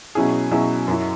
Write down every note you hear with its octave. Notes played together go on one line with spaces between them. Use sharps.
B2 F#3 C#4 E4 G#4
B2 F#3 C#4 E4 G#4
F#2 F#3 E4